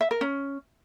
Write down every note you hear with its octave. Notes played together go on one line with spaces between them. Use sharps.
E5
A#4
C#4